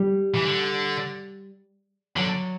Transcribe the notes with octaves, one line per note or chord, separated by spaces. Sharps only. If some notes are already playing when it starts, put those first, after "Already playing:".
Already playing: G3
E3
D3
D3 F#3